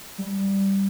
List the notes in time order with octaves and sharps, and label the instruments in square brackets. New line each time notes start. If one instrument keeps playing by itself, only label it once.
[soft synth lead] G3